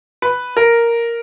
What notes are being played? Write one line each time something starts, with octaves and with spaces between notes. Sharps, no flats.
B4
A#4